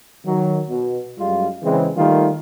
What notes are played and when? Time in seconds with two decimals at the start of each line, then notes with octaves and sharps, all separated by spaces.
0.25 D#3 F#3
0.69 B2
1.18 F#2 G3 G#3 F4
1.63 C#3 E3 G#3 C4
1.96 D#3 G3 A3 A#3 F4